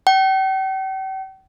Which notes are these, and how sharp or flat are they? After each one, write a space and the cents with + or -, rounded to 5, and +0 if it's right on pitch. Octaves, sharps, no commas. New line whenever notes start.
G5 -40